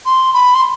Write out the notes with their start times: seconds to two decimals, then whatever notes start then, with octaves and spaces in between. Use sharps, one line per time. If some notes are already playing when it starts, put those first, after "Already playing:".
0.06 C6
0.34 B5
0.55 C6